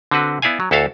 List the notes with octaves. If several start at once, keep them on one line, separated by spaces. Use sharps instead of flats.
D3 C4 F#4 B4
B3 E4 D5 F5 G#5
F#3
D2 E4 F#4 A4 F5 A5